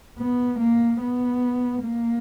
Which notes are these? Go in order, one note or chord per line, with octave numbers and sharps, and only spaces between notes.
B3
A#3
B3
A#3